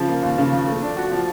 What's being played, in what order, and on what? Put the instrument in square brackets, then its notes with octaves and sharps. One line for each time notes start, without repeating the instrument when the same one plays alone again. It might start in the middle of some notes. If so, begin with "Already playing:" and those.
Already playing: [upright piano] C#3 F3
A#3
D#2
C#3
F3
A3
D4
F#4
F3